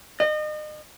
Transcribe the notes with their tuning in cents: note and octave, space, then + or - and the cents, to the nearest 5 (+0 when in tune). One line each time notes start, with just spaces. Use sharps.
D#5 -35